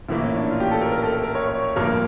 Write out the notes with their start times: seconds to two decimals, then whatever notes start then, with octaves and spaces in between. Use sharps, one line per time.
0.09 A#1 A2 E3 A#3 E4
0.22 C#4
0.36 D4
0.51 F4
0.60 G4
0.71 A4
0.81 A#4
0.92 A#4
1.03 A4
1.24 A#4
1.35 C#5
1.48 C#5
1.62 C#5
1.76 A1 G2 F3 A#3 A#4